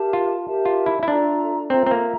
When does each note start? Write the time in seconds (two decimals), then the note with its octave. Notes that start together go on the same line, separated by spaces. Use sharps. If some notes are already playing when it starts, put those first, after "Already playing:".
Already playing: G4 A#4 E5 A5
0.13 F4
0.45 G4 A#4 E5 A5
0.65 F4
0.86 E4
1.03 E4
1.08 D4 F4 A4 E5 A#5
1.70 C4 F4 A4 E5 A#5
1.86 C4
1.91 A#3